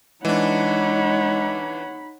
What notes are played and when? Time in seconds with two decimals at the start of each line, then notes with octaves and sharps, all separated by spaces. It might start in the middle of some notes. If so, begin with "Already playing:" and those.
0.25 E3 G#3 D4 D#4 C#5 F#5 B5